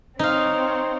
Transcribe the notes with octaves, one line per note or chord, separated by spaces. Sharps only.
C4 D#4 C#5 F5